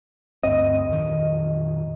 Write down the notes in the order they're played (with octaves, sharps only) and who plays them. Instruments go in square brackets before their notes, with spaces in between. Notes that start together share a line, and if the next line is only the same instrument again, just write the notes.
[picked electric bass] D2 G2 C4 [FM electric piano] D#5
[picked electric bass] F2 A#2 D#3